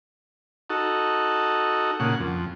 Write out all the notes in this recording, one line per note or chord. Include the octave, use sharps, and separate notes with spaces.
D#4 F#4 A4
A#2 C#3 F#5
F2